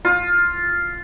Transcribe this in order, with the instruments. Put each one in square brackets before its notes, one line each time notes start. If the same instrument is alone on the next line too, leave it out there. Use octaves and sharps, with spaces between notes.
[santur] F4